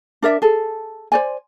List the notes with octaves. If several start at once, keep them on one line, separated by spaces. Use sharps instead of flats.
D4 A#4 D5 E5
G#4 A4
C5 D5 G#5